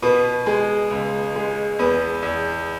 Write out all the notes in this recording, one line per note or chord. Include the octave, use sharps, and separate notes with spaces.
B2 B3
G#3
C#2
G#3
E2 B3
E2